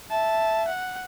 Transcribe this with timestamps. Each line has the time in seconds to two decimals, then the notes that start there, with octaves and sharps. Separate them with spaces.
0.11 E5 A5
0.68 F#5